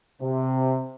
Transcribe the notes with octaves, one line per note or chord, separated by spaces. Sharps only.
C3